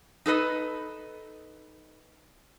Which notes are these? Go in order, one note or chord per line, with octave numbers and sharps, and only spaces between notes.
D#4 A4 B4 D#5